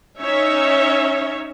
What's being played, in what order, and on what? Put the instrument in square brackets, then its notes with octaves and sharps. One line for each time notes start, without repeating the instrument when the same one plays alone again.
[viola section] C#4 D#4 C#5 E5